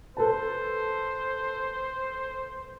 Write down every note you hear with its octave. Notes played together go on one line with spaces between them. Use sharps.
A4 B4 C5 A5